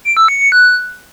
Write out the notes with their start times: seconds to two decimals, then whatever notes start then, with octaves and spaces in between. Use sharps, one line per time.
0.05 D7
0.17 E6
0.28 C#7
0.40 C#7
0.52 F#6